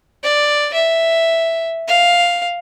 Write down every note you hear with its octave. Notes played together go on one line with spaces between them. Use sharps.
D5
E5
F5